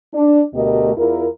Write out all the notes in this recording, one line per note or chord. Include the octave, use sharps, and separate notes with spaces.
D4
D2 B2 A3 G4 A#4 D#5
E2 E3 E4 F4 A#4